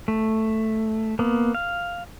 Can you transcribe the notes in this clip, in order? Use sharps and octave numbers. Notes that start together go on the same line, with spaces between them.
A3
A#3 B3
F5